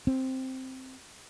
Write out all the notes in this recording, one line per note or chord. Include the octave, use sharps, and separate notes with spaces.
C4